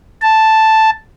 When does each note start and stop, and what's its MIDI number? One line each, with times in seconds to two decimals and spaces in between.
0.22 0.90 81